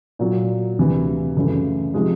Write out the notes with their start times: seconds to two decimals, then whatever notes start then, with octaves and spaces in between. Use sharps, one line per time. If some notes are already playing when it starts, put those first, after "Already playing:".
0.19 A#2 F#3 A#3
0.78 D2 C3 E3
1.36 F#2 C#3 E3 A3
1.94 C3 F3 G#3